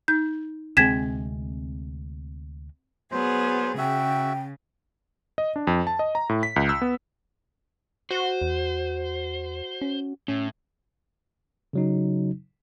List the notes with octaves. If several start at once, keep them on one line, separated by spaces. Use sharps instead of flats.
D#4 G6
D2 C3 G#3 C4 G5 G#6 B6 E7
F#3 B3 G#4 C5
C#3 F#4 E5 G5
D#5
D4
F2
A5
D#5
A#5
A2
B6
C#2
E6
B3
F#4 C5
E2
C#4
A2 C#4
C#3 F#3 D#4